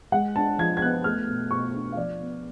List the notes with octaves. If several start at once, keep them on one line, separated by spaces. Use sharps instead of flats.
G#3 F#5
D4 A5
F3 G#6
G#6
B3 F#6
A3 F6
B2
B2 C#6
D4
F5
F3 D5
B3